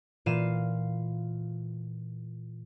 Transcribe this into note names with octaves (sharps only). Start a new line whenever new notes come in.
A#2 E3 F4 F5 D#7 E7